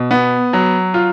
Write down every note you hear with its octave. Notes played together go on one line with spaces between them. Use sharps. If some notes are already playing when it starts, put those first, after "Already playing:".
Already playing: B2
B3
F#3
F4